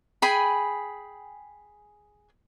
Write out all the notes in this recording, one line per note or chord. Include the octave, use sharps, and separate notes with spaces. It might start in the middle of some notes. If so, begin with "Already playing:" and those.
G#4 G5 G#5 B5